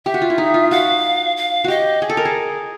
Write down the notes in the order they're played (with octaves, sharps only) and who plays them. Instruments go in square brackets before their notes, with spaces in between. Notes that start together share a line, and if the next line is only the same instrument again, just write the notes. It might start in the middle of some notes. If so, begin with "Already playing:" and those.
[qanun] G4 [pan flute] E5
[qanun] F#4
F4
E4
D#4
F4
[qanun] F#4 [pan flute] F5
[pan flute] F5
[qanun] F#4 G4 [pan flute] D#5
[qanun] G#4
A4
A#4
G#4